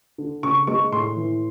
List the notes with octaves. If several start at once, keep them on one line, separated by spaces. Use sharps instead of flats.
D3
C#3 C#6
G#3 C#6
A2 C6
E3